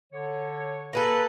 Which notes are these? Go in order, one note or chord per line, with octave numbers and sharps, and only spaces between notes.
D3 C#5
A#3 G#4 A4 B4